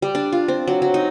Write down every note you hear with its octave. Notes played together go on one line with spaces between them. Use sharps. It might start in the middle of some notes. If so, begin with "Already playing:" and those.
G3
D4
F4
C4
F#3
F#3
D#4